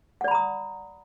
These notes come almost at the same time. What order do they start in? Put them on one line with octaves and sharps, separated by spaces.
F#5 D5 B5 A#5 D#6